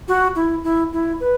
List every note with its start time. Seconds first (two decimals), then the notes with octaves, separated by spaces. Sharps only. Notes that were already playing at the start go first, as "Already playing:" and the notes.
0.08 F#4
0.35 E4
0.64 E4
0.93 E4
1.20 B4